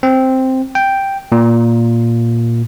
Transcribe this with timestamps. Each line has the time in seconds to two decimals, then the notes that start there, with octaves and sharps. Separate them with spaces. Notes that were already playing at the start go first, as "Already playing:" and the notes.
0.03 C4
0.75 G5
1.32 A#2